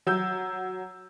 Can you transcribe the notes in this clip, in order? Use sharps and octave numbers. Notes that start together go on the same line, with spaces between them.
F#3 E6 G6